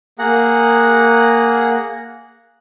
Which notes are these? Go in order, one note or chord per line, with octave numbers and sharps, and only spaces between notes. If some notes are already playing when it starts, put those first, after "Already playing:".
A#3 G#4 F#5 A#5